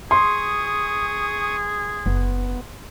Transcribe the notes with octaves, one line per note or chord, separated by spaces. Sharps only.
G#4 C6 C#6 D#6
F#1 B3